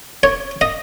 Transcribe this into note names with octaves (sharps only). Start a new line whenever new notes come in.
C#5
D#5